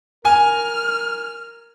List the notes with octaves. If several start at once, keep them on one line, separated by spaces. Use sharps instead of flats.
A#4 G#5 F6